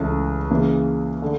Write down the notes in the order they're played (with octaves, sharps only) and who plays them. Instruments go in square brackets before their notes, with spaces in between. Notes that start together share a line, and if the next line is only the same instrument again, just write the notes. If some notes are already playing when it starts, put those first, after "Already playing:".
Already playing: [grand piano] C#2 C#3 E3 A3 E4
C#3 E3 A#3
D3 A3